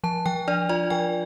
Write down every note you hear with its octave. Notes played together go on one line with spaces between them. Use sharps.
F3 A5
F3 G5
D4 D5
F4 D5
F3 G5